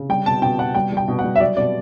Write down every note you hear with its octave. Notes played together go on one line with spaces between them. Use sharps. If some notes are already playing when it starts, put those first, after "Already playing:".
Already playing: C#3
G3 G5
B2 A5
B2 G5
B2 F#5
G3 G5
G3 G5
B2
F#5
G3
E5
F#3 D5
B2 D5